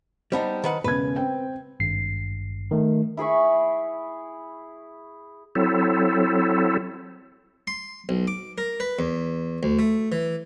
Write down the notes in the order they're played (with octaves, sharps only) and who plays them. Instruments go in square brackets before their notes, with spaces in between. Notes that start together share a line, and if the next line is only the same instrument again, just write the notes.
[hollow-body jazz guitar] G3 B3 D#4 [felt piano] C5 A5
[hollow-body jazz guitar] D#3 B4 F#5
[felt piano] E1 C#3 G#6 [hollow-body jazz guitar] B4
[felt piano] C4 G5
[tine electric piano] G#1 G2 C7
D#3 A3
[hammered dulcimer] E4 G#4 B5 C#6
[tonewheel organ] F#3 C4 E4 A4
[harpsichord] C6
B1
D6
A#4
B4
E2
D2
A3
E3